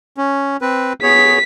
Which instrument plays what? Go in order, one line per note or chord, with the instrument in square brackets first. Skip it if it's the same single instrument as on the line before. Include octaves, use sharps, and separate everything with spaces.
[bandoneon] C#4
C4 B4
[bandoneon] B3 G#4 C#5 [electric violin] B6